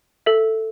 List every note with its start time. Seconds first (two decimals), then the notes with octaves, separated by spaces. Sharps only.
0.26 A4 E5